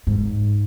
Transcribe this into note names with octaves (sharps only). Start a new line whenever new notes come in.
G#2